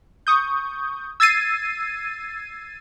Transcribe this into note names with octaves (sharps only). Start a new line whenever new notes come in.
C#6 D#6 G6
E6 G#6 A6 C7 D#7